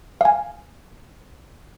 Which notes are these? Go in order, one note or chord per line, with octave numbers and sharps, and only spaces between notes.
F5 G#5